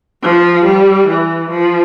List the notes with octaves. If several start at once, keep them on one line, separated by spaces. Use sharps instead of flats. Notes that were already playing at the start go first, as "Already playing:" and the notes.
F3
G3
E3
F3